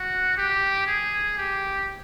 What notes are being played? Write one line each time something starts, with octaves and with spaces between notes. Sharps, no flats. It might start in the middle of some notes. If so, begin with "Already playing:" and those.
Already playing: F#4
G4
G#4
G4